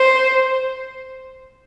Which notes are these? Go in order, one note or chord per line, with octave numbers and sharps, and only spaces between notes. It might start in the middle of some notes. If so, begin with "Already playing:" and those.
Already playing: C5